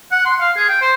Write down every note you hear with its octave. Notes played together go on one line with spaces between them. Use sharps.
F#5
C6
F5
G#4
G5
C5